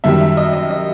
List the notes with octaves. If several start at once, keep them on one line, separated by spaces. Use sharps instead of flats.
F#2 D#3 G3 E5
E5
D#5
D#5
D#5